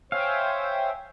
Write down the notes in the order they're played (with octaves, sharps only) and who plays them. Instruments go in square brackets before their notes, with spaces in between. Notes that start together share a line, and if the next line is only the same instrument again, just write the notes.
[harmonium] C5 C#5 [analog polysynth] E5 G5 G#5 [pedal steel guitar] F5